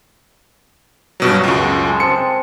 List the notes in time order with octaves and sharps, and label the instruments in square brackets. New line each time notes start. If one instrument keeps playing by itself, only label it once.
[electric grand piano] G2 B2 F#3
C#2 F#2
[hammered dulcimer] G#3 A4
[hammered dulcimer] C4 G#4 [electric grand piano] C#7